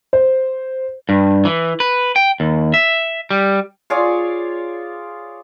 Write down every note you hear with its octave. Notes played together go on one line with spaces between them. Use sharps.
C5
G2
E3
B4
G5
D#2
E5
G3
F4 G#4 C#5 D5